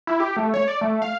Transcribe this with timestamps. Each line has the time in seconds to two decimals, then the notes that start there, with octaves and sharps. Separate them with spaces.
0.07 E4
0.20 G4
0.36 A3
0.54 C#5
0.68 D5
0.81 A3
1.02 F5